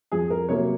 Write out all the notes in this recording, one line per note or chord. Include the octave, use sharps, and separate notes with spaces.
F2 G#4
A#4
C3 F#3 A#3 C#5